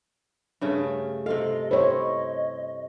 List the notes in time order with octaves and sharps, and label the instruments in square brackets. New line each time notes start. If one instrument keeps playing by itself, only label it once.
[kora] G2 C#3 A3
[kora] C3 F4 F5 [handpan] A4 [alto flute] D#5
[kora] E4 [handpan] C5 C#5 [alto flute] D#5